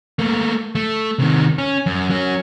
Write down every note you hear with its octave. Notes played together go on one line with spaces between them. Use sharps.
A3 A#3
A3
C3 D#3
C#4
F#2
F#3 C#4